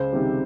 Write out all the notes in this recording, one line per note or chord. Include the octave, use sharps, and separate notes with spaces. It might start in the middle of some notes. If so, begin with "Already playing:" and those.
Already playing: C#2 C5
C3 D#3 G3 C4